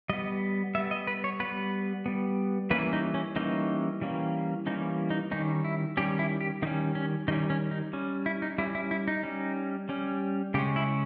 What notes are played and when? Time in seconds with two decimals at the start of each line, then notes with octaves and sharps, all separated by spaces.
0.10 G3 B3 D#5
0.75 B3 E5
0.78 G3
0.91 D#5
1.07 B4
1.24 C#5
1.40 G3 B3 B4
2.06 G3 B3
2.70 E3 G3 A#3 C#4 B4
2.93 D#4
3.14 C#4
3.36 E3 G3 A#3 C#4 D#4
4.01 E3 G3 A#3 C#4
4.66 E3 G3 A#3 C#4 D#4
5.10 D#4
5.31 D#3 G3 C#4 D#4
5.64 E4
5.97 D#3 G3 C#4 G4
6.19 E4
6.41 G4
6.62 D#3 G3 C#4 D#4
6.95 C#4
7.28 D#3 G3 C#4 D#4
7.50 C#4
7.71 D#4
7.93 G3 C#4
8.26 E4
8.42 D#4
8.58 G3 C#4 E4
8.75 E4
8.91 E4
9.08 D#4
9.23 G3 C#4
9.89 G3 C#4
10.54 C#3 G#3 C#4 G4
10.76 E4